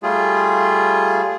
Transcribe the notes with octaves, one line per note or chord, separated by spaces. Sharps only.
G3 A3 F4 G#4